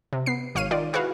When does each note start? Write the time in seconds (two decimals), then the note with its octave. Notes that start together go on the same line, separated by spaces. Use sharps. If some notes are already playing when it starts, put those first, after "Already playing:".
0.13 C3
0.26 B3 C7
0.55 G#1 C#5 F5 F6 C7 D#7
0.71 D#3 F4 D5
0.93 E4 F#4 G#4 B4 F5